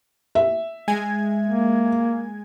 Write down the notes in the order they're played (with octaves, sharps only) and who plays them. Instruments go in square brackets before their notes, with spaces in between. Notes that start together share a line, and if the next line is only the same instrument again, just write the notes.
[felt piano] E5
[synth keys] G#3 G#5 G#6
[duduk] A#3